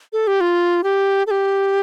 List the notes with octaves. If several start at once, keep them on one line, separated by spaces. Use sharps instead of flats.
A4
G4
F4
G4
A4
G4